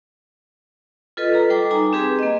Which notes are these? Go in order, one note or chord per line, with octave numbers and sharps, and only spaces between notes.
F4 A4 B4 D#5
A4 B4 A#5
G3 A4 G5 D6
D#4 G#5 A#5 D6
C4 G4 G#4 B4
A#3 D#5